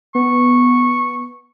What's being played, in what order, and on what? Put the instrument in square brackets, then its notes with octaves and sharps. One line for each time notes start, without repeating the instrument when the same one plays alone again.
[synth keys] B3 [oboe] C#6